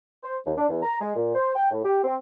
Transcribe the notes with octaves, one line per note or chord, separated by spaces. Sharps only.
C5
D#2
D4
E2
A#5
G#3
A#2
C5
G5
A2
G4
C4